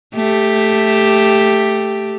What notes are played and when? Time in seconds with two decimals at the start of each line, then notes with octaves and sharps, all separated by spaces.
0.15 A3 G4